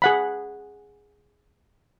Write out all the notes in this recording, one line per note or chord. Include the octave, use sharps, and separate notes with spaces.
G#4 F#5 B5